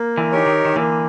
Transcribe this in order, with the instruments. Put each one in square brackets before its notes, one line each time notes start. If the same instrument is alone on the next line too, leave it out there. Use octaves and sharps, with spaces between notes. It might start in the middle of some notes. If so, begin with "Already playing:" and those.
Already playing: [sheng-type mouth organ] A#3
[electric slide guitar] D3 E3
[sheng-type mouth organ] D#4 G4 A#4 C#5
[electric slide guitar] D#3
D#3
[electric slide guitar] D3 E3 [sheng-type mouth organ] A#3